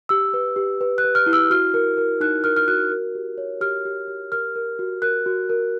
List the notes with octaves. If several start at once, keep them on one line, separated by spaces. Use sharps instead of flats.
G4 E6
B4
G4
B4
F#6
B4
F6
E4
E6
F#4 F6
A#4
A#4
D#4 F#6
A#4 F6
F6
F#4 F#6
A#4
G4
C#5
G4 F6
G4
G4
A#4 F6
A#4
F#4
A#4 F#6
F#4
A#4